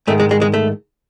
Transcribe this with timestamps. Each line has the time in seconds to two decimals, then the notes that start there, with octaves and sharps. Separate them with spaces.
0.07 G#2 D#3 A3
0.20 G#3
0.31 G#3
0.42 G#3
0.54 A3